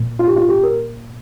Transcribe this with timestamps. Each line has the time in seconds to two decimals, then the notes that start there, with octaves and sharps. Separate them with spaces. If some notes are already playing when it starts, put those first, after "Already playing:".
Already playing: A#2
0.19 F4
0.27 G4
0.36 F4
0.49 G4
0.63 A#4